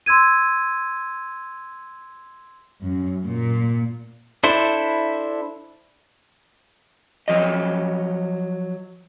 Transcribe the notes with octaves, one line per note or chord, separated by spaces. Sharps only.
C6 E6 G#6 D#7
F#2
A#2
D4 E4 A4 C5
F3 F#3 D#5